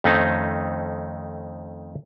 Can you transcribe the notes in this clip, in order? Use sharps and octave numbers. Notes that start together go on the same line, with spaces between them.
F2 D#3 A3 C4 C#4 D#4